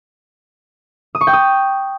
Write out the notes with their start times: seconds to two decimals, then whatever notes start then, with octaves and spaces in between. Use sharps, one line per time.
1.15 D#6
1.21 C#6
1.27 G5
1.33 D#6